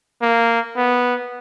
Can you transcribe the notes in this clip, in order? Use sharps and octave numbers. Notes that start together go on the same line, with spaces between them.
A#3
B3